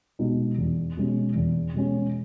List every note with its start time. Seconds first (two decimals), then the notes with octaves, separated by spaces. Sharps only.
0.19 B2 G#3 D#4
0.58 E2
0.97 B2 G#3 C#4
1.36 E2
1.74 B2 G#3 C#4